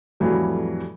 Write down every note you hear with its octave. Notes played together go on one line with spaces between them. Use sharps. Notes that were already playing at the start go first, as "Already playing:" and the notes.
F2 A2 E3 F#3 G3